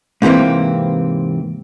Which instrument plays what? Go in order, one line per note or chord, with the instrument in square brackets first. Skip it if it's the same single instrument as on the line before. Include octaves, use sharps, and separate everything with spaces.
[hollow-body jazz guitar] G#2 C3 E3 A#3 C4